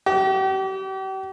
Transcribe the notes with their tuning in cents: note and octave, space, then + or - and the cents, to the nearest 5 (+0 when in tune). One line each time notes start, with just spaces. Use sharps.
G4 -40